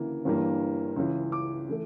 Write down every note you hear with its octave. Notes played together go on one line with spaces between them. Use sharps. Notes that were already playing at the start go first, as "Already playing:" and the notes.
Already playing: D2 C#3 E3 A#3
G1 G2 E3 G3 A#3
C#2 C#3 E3
D6
E3 A3